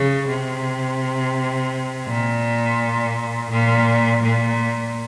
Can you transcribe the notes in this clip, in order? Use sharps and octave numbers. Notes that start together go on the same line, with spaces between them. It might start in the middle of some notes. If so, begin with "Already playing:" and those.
Already playing: C#3
C3
A#2
A#2
A#2